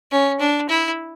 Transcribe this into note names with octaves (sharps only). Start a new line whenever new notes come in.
C#4
D4
E4